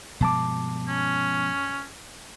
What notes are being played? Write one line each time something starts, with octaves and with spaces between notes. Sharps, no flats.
G2 B2 F3 G#3 A5 D6
C#4